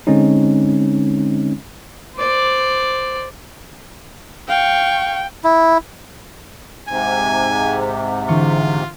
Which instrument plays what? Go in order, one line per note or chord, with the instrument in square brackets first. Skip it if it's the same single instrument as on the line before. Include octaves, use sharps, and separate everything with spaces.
[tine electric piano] D3 G#3 C4 C#4 D#4
[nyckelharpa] C5 D5
[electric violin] F5 C#6 [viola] G5
[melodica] E4
[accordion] G#2 C3 [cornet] G#5
[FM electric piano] D3 E3 C#6 [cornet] F4